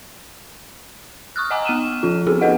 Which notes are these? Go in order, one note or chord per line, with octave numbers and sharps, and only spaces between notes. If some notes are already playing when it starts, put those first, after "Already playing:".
C#6 D#6 F6 F#6
D#5 F#5 G#5 A#5 D6 E6
B3 F6 D#7 E7
F3 C#4 F4
B3 C4 D#4 F#4 G#4 A4
B3 F4 A4 B4 D#5 F#5